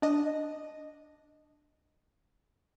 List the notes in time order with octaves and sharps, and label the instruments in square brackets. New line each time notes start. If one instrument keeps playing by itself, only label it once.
[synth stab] D4 D#5